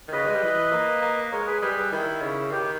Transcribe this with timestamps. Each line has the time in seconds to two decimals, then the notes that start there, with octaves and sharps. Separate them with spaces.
0.08 D#3
0.13 C#3 B4 D#5
0.26 G#3
0.34 G3
0.43 E3
0.72 A#3
1.02 A#3
1.32 G#3 A#4 C#5
1.47 G#4 B4
1.61 G3 G#4 B4
1.77 G#4 B4
1.92 D#3 E4
2.22 C#3
2.52 D#3 G4